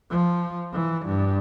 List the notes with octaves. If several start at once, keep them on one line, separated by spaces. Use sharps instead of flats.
F3
E3
G2